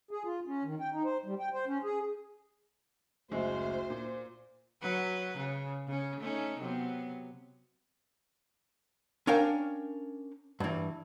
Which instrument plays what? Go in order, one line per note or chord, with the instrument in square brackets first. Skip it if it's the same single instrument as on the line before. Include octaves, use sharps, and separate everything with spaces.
[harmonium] G#4
F4
C#4
D#3
G5
D#4
C5
G3
G5
C5
C#4
G#4
[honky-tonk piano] F#1 G#3 E4 [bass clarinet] D2 [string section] C5
[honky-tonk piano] A#2
[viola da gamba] F#3 B4
C#3
C#3 C#4
A3 C#4 D#4
C3 F#3 B3
[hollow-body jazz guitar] C#4 D4 A#4 F5 G5
G2 E3